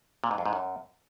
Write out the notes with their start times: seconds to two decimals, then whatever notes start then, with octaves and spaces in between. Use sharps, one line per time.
0.24 A#2
0.31 G#2
0.38 F2
0.46 G#2
0.53 F#2